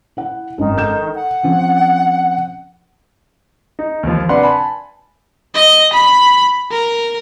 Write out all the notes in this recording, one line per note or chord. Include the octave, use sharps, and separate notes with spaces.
E4 F#5
G#1 F#2 D#3
A4 G6 E7
F#5
F3 C4 C#4
D#4
D#2 F3
C3 D4 B4 F#5 C6
G#5 A5 B5
D#5
B5
A#4